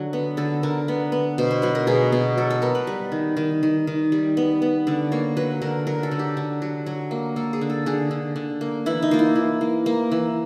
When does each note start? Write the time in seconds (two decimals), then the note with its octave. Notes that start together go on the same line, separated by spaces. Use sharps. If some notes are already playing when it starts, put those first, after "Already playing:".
Already playing: D3 F#3
0.13 B3
0.37 D3 A4
0.63 D3 A#4
0.88 B3
1.12 B3
1.38 B2 C5
1.51 C5
1.62 F#3 B4
1.75 A#4
1.87 B2 G#4
2.12 B2
2.38 F#3 A4
2.50 A4
2.62 B3 A#4
2.75 B4
2.87 G3
3.12 D#3
3.37 D#3
3.63 D#3
3.87 D#3
4.12 G3
4.37 B3
4.62 B3
4.87 D3 D5
5.12 A#3 C#5
5.37 F#3 B4
5.62 D3 A#4
5.87 F#3 A#4
6.03 A4
6.11 D3
6.19 G4
6.37 D3
6.62 F#3
6.86 F#3
7.11 A#3
7.36 A#3 A4
7.53 G#4
7.61 D3
7.70 A4
7.86 D3 G#4
8.11 D3
8.36 D3
8.61 A#3
8.86 E3 E4
9.02 D#4
9.11 A#3 F4
9.19 E4
9.35 E3
9.61 A#3
9.86 A#3
10.12 E3